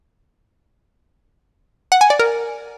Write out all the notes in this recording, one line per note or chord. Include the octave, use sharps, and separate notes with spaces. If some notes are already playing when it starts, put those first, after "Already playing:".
F#5
G#5
D5
A#4